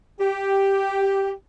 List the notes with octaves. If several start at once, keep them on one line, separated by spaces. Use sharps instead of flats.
G4